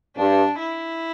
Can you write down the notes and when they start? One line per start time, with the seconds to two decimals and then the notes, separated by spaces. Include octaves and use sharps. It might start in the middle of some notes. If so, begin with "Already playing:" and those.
0.16 G2 D4
0.59 E4